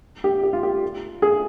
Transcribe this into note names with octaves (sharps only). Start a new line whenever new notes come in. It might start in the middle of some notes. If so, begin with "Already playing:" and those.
G4
G4
F4
G4
G#4